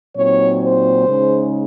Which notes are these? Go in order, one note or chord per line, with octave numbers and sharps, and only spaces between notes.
A#2 F#3 C4 D#4 C#5
C5
C#3 G#3 D#4